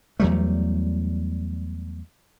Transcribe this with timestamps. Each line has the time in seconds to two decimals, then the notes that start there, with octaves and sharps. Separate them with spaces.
0.20 E2 F#3 G3 A3